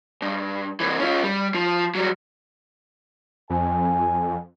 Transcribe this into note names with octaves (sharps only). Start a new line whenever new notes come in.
G2
C2 E3
C#4 F4
G3
F3
F#3 G3
F2 G#5